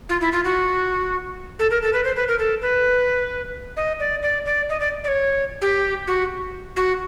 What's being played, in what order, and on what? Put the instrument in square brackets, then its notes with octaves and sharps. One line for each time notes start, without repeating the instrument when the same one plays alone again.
[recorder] F4
E4
F4
F#4
A4
A#4
A4
B4
C5
B4
A#4
A4
B4
D#5
D5
D5
D5
D#5
D5
D5
C#5
G4
F#4
F#4